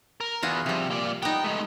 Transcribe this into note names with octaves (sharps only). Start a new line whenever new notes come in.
A#4
E2 F4 F#4 G#4
C3 F3 G3
A#3 D5
B3 D#4 G5
G#3 A3